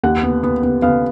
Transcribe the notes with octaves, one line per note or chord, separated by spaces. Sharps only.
D#2 F#5
B3
B3
B3
B3 F5